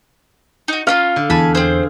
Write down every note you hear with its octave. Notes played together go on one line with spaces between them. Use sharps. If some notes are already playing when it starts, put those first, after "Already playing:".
D#4 F#4
C#4 D4 F4 F5
D3
E2 G#5 A5 B5
C4 G#4 C5